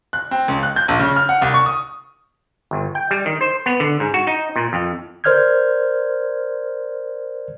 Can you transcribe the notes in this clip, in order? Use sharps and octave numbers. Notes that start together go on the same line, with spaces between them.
F#6
C4
C#2
F#6
G6
A#1
C#3
F6
F#5
C2
C#6
D#6
G1
G5
G3
D#3
C5
B3
D3
G#2
F#4
D#4
A#2
F2
A#4 C5 D5 F6 G6 G#6